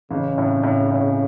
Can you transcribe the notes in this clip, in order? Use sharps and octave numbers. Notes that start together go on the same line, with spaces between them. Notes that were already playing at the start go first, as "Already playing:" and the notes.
A1 C#3
A2
A2
A2